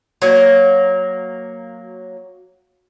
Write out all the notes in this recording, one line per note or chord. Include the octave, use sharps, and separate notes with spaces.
F#3 A#3